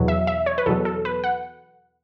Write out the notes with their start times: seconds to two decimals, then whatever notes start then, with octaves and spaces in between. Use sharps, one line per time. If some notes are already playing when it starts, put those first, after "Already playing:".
Already playing: E2 B2 F#3
0.08 E5
0.27 E5
0.46 C#5
0.58 B4
0.66 E2 B2 F#3 A4
0.85 A4
1.05 B4
1.24 F#5